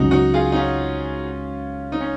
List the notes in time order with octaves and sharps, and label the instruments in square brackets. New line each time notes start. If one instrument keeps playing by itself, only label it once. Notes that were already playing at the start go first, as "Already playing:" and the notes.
Already playing: [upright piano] C#2 C#3 F#3 [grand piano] D#4 F#4
[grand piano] D#4 F#4
F4 G#4
D#4
C#4 F4
D#4
C#4